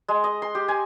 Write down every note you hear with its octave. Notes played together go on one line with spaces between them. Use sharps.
G#3
D#5
C6
G4
G#5